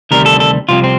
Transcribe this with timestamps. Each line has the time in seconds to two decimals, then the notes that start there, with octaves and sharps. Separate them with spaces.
0.11 D2 C3 D#3 G3 A#4
0.26 A4
0.40 A4
0.69 C2 C3 F3 C4 F4
0.84 C4